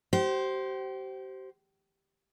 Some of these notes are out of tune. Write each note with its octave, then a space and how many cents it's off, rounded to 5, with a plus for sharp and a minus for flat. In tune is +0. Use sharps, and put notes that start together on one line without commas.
G4 -35 C5 +0